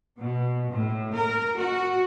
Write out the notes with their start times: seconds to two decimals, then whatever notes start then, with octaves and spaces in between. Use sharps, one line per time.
0.19 B2
0.70 A2
1.14 A#4
1.56 F#4